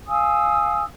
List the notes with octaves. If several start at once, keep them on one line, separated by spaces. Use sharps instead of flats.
F5 G#5 D#6 E6